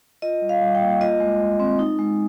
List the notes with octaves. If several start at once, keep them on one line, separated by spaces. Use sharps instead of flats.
F4 D#5
G3
F5
G3
G5
A#3
F4 D#5
G#3
G#3
C4
D#4
G#3